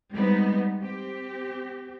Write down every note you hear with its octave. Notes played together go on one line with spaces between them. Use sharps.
G3 G#3 B3 C4 D#4
C4 G4